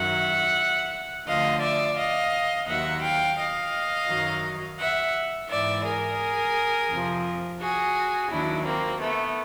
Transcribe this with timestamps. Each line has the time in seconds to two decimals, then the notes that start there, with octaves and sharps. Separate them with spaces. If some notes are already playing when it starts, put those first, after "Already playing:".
Already playing: F#2 D#3 F#3 E5 F#5
1.26 D2 D3 F3 D#5 F5
1.61 D5 E5
1.96 D#5 F5
2.66 D#2 D#3 F#3 E5 F#5
3.02 F5 G5
3.37 D#5 F5
4.08 F#2 D#3 F#3
4.78 E5 F#5
5.48 G#2 E3 D5 E5
5.83 G#4 A#4
6.89 F2 C3 F3
7.59 F#4 G#4
8.30 D#2 D#3 F#3 D4 E4
8.65 A#3 C4
9.00 A3 B3